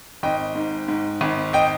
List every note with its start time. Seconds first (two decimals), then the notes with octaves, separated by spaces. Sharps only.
0.23 G#1 D#5 G5
0.55 G#2
0.88 G#2
1.21 G#1
1.53 D#5 G5